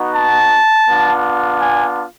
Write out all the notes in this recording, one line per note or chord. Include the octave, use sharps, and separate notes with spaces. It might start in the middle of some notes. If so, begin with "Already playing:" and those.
Already playing: B3 D#4 F#4
A5
B3 D4 F4
G#5